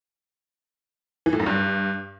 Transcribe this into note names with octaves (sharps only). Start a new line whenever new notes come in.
E3
A2
F#2
G2